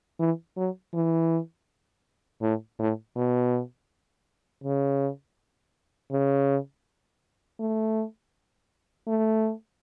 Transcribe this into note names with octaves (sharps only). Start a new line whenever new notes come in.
E3
F#3
E3
A2
A2
B2
C#3
C#3
A3
A3